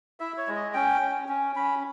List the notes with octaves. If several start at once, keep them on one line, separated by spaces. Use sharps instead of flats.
E4 E5
C#5
G#3
D#5
C#4 G5
C#4
C#4
C#4 B5